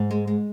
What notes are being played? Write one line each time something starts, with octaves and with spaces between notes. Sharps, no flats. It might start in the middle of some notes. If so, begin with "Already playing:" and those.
Already playing: G#2
G#3
G#3